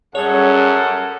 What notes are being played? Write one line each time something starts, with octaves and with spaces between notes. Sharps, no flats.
F#2 G3 C#4 G#4 A4 C#5 F#5 G#6